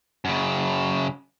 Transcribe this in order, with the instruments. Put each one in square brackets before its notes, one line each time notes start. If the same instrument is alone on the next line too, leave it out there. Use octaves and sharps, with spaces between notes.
[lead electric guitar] F#2 C#3